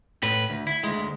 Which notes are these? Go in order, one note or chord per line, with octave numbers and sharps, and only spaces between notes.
A2 B4
D2
E4
D2 G#3